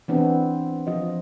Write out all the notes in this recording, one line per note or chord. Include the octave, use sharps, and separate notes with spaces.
E3 B3 C4 D4
F3 F4 D#5